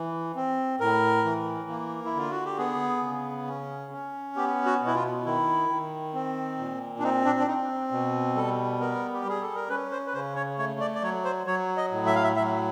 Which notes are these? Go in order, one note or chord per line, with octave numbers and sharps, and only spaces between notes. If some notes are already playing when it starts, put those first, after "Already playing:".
Already playing: E3
C4
A2 A#4
E3
A#3
E4
D3 F4
F#4
G4
B3 G#4
C#3
C#4
C#4
B3 G4
F#4
B2
E4
F4
D#3 E4
D#3
C4
A#2
D4
C4 D#4
D4
D4
C4 D#4
B2
G3 A4
B3 A#4
G4
G3 G#4
A4
A#4
C#4 B4
C5
B4
C#3 C5
C#5
A3 C#5
D5
D5
F#3 C#5
C5
F#3 C#5
D#5
A2
E5
F5
E5
F#3 E5